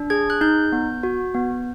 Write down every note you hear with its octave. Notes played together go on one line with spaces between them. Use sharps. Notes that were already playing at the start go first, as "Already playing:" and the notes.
Already playing: D4
G#4 G#6
F#6
D#4 G6
B3
F#4
B3